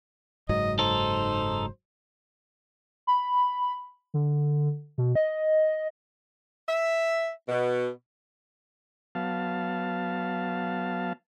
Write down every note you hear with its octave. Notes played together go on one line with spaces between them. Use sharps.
F#1 G#2 F#3 D#5
D#4 A4 C5
B5
D3
B2
D#5
E5
B2
F#3 B3 F5 A5